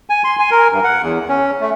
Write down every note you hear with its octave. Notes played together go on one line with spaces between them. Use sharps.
G#5
C6
G#5
A#4
G2
F#5
E2
C#4
A3